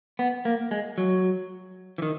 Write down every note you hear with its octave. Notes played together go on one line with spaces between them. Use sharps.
B3
A#3
G#3
F#3
E3
D#3